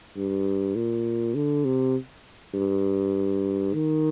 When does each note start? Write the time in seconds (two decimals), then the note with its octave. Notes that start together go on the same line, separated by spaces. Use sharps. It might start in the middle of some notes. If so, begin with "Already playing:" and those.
0.16 G2
0.75 A#2
1.35 D3
1.65 C3
2.54 G2
3.73 D#3